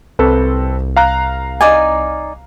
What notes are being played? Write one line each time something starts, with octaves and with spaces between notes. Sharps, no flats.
C2 C4 A4 B4
F5 A#5 F#6
D#4 D5 G#5